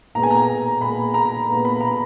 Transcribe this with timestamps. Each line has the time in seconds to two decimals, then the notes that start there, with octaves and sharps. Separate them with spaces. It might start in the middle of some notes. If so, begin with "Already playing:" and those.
0.15 A#2 G#3 B3 A#5
0.23 G#5
0.31 A#5
0.81 A#2 G#3 B3 B5
1.14 A#5
1.49 A#2 G#3 B3
1.65 B5
1.81 A#5